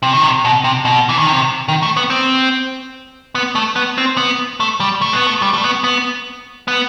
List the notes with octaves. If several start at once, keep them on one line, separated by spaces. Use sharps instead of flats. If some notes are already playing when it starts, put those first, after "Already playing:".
C3
D#3
C3
B2
C3
B2
E3
D#3
C3
D#3
A3
B3
C4
B3
A3
B3
C4
B3
A3
G3
A3
B3
A3
G3
A3
B3
B3
B3